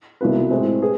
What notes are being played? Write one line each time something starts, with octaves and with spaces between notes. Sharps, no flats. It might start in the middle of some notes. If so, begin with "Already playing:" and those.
C2 B2 B3 F4 B4
A2 G#3 C4
G#4 B4